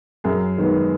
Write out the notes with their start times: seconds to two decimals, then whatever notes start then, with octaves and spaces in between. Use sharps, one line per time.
0.24 F#2 G#4 A#4
0.58 D#3 G#3 B3